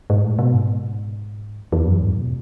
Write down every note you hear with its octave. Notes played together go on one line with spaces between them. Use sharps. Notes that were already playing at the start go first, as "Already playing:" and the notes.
G#2
A2
B2
G#2
E2
F#2
G#2
B2